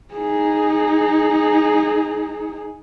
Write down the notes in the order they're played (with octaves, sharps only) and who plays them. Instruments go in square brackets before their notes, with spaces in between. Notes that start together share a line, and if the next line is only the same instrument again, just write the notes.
[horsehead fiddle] D#4 G#4